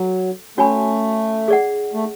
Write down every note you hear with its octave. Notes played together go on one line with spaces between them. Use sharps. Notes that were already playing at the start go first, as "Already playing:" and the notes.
Already playing: F#3 A4
A3 C#4 F#4 C#5 G#5 B5
G#4 D5 F#5
A3